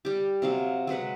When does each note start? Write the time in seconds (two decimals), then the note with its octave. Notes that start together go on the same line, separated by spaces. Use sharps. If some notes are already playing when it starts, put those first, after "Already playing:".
0.05 G3 G4
0.42 C3 F#3 F5
0.87 F#3 G#3 B4 F#5